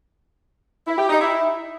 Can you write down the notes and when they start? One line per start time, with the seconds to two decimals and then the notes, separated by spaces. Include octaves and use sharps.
0.87 E4
0.98 G4
1.09 D#4
1.20 E4